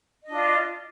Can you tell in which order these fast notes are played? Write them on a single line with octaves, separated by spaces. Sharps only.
D#5 D4 F4